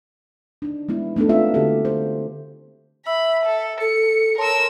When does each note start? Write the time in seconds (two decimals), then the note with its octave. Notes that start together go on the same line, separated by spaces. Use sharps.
0.62 D4 D#4
0.89 G#3 B3 E4
1.16 A3 B3 D4 D#4 A4
1.29 C4 F4 E5
1.54 D3 C4 F#4 G4 A4
1.85 C5
3.07 E5 B5 E6
3.45 A4
3.81 A4 C#7
4.38 A#4 C#5 A5 C6 E6